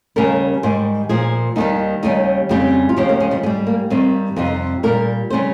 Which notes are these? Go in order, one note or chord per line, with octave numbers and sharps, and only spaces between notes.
D#2 C#3 G3 A#4
G#2 D#3 G3 C5
A#2 F3 G#4
D#2 D#3 G3 D#4
D#2 C#3 G3 D#4
F2 C#3 G3 G4
F4
D#2 C#3 F3 G4
A#3
G#3
G3
G#2 G3 G#3
A#3
G2 D#3 G3 C4
F2 C3 G3 D#4
A#2 G3 A#4
C#3 G3 C5